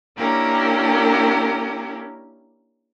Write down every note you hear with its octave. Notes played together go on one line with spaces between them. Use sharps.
A#3 C#4 D4 E4 G4 A#4